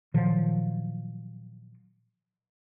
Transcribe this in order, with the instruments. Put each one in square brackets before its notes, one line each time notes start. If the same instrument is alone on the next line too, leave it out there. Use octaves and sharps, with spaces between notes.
[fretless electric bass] A#2 D#3 F3 F#3